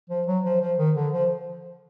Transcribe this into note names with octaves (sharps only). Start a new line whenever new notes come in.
F3
F#3
F3
F3
D#3
D3
F3